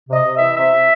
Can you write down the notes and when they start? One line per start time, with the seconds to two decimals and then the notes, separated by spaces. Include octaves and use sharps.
0.08 C3 D#5
0.24 C3
0.35 E5
0.40 E3
0.56 C3 E5
0.73 C3